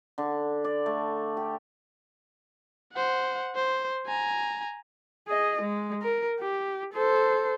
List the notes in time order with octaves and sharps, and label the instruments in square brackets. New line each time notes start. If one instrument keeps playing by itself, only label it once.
[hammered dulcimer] D3
D5
A3
G4
[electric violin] C5 F#5
C5
G#5 A#5
[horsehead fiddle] G#4 D#5
G#3
A#4
G4
A4 C5